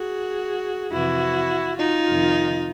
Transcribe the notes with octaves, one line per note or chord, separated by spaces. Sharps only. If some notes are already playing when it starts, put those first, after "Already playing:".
Already playing: F#4 G#4
F2 C3 E3 E4 F#4
D#4 F4
F2 C3 D#3